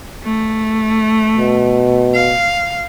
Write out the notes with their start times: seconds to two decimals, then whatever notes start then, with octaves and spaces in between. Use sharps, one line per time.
0.23 A3
1.37 B2
2.15 F5